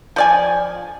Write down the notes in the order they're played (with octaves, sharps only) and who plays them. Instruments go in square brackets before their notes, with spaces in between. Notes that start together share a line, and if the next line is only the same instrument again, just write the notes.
[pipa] F3 D5 G#5